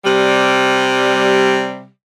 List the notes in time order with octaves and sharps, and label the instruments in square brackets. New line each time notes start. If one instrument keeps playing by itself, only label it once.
[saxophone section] C3 G3